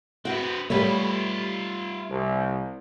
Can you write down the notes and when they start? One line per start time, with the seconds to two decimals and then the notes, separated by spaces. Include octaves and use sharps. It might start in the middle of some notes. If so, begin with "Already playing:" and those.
0.25 C4 F#4 B4 F#5
0.70 G3 A3 B3 F4 C#5 E5
2.10 C2